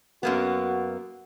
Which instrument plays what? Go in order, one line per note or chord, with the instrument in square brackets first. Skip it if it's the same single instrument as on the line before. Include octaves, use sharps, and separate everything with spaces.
[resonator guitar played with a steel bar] F#2 A#3 B3 [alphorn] F#4